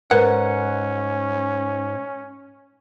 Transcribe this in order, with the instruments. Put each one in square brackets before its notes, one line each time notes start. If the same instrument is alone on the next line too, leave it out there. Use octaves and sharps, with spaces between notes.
[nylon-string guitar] G#2 [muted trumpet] C#4 [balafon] A#4 B4 [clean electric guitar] F#5